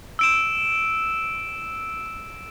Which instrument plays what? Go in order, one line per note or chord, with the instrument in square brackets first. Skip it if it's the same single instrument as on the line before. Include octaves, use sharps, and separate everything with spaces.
[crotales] E6 D7 E7